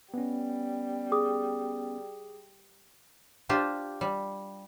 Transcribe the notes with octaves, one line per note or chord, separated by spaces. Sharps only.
G3 B3 C#4
G#4 D6 D#6
D4 F4 G4 C5
G3